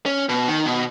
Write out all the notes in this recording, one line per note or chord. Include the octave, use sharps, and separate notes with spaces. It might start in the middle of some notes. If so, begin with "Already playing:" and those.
C#4
B2
D#3
B2